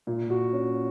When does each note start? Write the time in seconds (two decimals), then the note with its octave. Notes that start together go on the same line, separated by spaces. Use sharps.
0.07 A#2
0.30 F#4
0.53 C#4